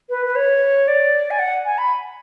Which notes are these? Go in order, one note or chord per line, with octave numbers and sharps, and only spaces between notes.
B4
B4
C#5
D5
G#5
F#5
G#5
B5